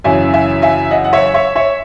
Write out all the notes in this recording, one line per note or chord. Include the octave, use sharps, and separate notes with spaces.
F#2 C#3 E3 E5 G#5
E5 G#5
E5 G#5
D#5 F#5
F#5
C#5 E5
C#5 E5
C#5 E5